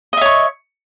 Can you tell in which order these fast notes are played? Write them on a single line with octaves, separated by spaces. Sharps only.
D#5 E5 C#5 C#6